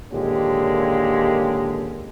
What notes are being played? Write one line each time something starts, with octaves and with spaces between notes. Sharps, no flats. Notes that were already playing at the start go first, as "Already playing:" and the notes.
D#2 A#2 D3 G#3 C#4 G4